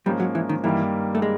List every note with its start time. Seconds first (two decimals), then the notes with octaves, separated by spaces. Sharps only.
0.06 G#2 F3 G3 A#3 C#4
0.20 F#3
0.35 E3
0.49 D#3
0.64 G2 D#3 E3 G3 A#3
1.15 A3
1.22 G#3